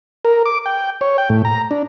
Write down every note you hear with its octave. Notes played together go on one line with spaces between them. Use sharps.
A#4
D6
G5
C#5
G5
A2
A#5
D4